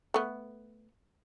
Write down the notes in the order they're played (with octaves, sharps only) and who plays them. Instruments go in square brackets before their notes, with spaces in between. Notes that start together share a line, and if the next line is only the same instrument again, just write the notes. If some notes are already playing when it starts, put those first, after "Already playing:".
[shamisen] A3 B3